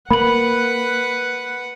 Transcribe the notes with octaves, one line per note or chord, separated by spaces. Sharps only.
A#3 B4 F#5 B5 F#7